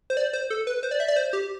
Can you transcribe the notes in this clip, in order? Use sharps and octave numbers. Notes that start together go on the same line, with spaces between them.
C5
D5
C5
A4
B4
C5
D5
E5
D5
C5
G4